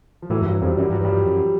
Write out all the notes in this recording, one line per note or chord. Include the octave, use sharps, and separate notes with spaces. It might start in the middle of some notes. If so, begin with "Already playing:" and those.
F3
A2 E3 F#3
F#2
G2 E3 F#3
F2 F3 G3
F#2 G3
G2 F#3
G2
F3 G3
G2
F#2